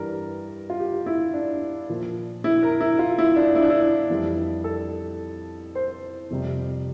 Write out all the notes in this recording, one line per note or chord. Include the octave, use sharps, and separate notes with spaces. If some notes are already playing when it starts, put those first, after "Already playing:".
Already playing: G2 E3 G3 A#4
F4
G4
E4
D4
A#2 F3
E4
A#4
E4
F4
E4
D4
E4
D4
E4
F2 E3 G3
A4
C5
F2 C3 G3